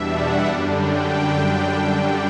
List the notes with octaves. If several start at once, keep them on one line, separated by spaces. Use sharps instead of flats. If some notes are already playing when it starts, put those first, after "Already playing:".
Already playing: E2 B2 G3 D4 E5
F#5
F#2 D3 G3 D4
G5